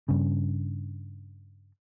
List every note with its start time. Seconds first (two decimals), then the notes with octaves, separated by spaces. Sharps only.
0.09 G2 C#3